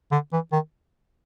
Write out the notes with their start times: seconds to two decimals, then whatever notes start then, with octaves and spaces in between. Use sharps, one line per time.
0.11 D3
0.33 E3
0.52 D#3